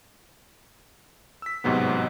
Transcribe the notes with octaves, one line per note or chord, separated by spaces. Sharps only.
E6 B6
A1 G#2 C3 F#3 B3